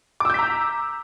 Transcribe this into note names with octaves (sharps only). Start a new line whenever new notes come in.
A#5 D6 E6 G6 B6